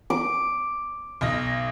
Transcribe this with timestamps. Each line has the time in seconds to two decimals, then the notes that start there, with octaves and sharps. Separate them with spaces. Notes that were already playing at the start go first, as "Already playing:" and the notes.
0.10 D6
1.21 B1 D#5 A#6